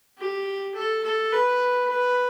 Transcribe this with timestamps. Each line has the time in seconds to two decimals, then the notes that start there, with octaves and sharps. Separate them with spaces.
0.18 G4
0.75 A4
1.04 A4
1.32 B4
1.90 B4